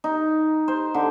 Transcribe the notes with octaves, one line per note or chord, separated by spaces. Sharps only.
D#4
C5
D3